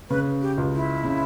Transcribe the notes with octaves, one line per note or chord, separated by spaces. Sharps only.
C#3 B4
G4
C#2
E4
C#3